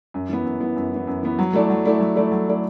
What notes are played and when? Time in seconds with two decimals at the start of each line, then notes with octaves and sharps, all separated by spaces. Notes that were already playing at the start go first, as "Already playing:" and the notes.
0.14 F#2
0.29 E3 B3
0.45 F#2
0.60 E3 B3
0.76 F#2
0.91 E3 B3
1.07 F#2
1.23 E3 B3
1.39 F#3
1.53 A3 E4 A4 D5
1.70 F#3
1.85 A3 E4 A4 D5
2.00 F#3
2.16 A3 E4 A4 D5
2.32 F#3
2.48 A3 E4 A4 D5